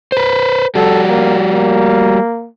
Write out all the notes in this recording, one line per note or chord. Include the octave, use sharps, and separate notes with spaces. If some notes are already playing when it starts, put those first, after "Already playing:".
B4 C5
G3 F#4 A4
A#3
A#3